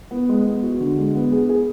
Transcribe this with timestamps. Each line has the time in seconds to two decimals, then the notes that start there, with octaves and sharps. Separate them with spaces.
0.11 B3
0.29 G#3
0.46 B3
0.63 F#4
0.80 D3
0.97 G#3
1.15 B3
1.32 G#4
1.49 G#4